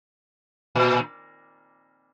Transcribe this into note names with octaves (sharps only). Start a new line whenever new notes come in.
A#2